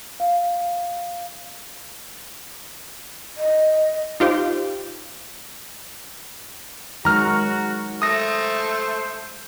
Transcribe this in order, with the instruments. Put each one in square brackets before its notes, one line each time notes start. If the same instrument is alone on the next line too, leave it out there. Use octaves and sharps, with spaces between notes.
[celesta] F5
[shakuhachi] D#5
[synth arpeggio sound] D#4 F4 G4 C5
[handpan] D#3 F#3 G#3 [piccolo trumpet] F#4 [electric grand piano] A#5 F6
[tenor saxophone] A3 [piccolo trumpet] C5 [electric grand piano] D#6 A#6